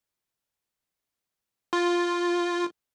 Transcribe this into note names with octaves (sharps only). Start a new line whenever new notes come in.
F4